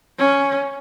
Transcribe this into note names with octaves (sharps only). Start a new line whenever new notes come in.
C#4